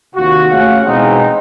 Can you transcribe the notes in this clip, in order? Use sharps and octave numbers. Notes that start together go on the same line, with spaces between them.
D#2 C3 F4 F#4
A3 C#4 G#4 F5 F#5
B2 E3 G#3 B3 C4 D#4